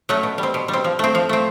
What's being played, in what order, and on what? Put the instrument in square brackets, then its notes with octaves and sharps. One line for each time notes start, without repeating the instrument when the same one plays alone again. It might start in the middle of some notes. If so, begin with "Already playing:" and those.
[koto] F#3 A3 C#4
B2
G3
C4
B2
G3
C4
F3
A3 C4
F3
A3 C4